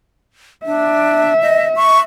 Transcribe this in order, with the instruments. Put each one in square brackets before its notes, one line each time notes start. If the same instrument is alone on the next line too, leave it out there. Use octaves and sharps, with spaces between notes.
[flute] D4 [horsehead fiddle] E5
[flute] D#5
C#6